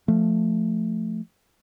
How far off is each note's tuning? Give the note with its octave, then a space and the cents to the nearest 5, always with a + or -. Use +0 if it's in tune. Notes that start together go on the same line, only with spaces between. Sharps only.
F3 +0 A3 +0